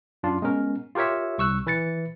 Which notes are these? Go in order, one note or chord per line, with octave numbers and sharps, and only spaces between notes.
F#2 D4 F4
G#3 B3 C#4 A#4
F4 G4 A#4 C#5 E5
C2 C#6 E6 F#6
E3 B4 A6 C#7